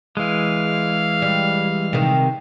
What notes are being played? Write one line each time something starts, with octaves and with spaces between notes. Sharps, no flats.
E3 G#3 F5
G3
C3 D#3